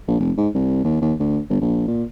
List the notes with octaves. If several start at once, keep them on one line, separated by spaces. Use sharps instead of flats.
A#1
F1
G#2
C2
D#2
D#2
D2
G1
A#1
A#2